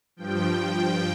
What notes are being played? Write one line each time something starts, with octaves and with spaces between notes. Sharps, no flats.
G2 F3 G5
G5